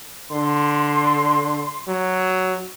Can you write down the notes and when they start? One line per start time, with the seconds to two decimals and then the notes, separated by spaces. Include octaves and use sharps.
0.31 D3 C6
1.87 F#3